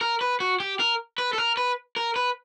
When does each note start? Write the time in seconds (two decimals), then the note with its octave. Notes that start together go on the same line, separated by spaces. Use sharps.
0.01 A#4
0.21 B4
0.40 F#4
0.60 G4
0.80 A#4
1.18 B4
1.33 A4
1.38 A#4
1.57 B4
1.96 A#4
2.16 B4